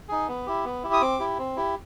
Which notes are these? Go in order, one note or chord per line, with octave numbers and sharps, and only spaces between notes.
D#4 G#4
B3
E4 G4
B3
E4 G4
D#6
C4 D6
E4 G4
C4
E4 G4